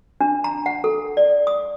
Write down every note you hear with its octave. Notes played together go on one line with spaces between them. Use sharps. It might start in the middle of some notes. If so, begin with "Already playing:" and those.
D4
A#5
F#5
A4
D5
D#6